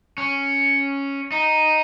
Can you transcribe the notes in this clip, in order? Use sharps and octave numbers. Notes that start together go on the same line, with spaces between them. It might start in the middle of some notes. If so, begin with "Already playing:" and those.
C#4
D#4